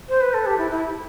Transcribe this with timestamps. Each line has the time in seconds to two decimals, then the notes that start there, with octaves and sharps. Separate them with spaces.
0.08 C5
0.21 B4
0.33 A4
0.45 G4
0.57 E4
0.70 E4